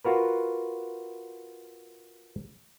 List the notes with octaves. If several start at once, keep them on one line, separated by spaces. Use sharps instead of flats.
F4 F#4 A#4 B4